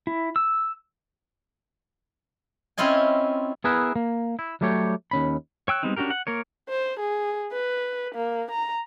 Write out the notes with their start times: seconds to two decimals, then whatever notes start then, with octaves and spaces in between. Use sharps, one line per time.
0.07 E4
0.36 E6
2.78 C4 C#4 E4 F4 D#5 G#5
3.64 B3 E4 G#4 A#4 B4 E5
3.96 A#3
4.39 E4
4.61 F#3 G3 A3 G4 C#5
5.11 D#2 C#4 B5
5.68 C#5 G5 E6 F#6
5.83 G3 G#3 B3 C4 D#4
5.96 C#4 D4 F#4 G4 A#4
6.10 F#5
6.27 A#3 A#4 C#5
6.69 C5
6.99 G#4
7.52 B4
8.15 A#3
8.51 A#5